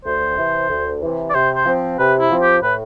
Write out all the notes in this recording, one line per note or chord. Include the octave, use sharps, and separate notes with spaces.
D2 C5
C3 E3
D2
C3 E3
D5
C3 C5
C5
F3 C4
C3 B4
E4
F3 C4
G4
A2 B4